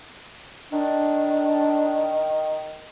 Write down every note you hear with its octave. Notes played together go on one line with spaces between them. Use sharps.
D#3 D4